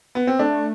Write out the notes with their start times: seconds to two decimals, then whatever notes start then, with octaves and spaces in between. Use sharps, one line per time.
0.15 B3
0.27 C4
0.39 A3 D4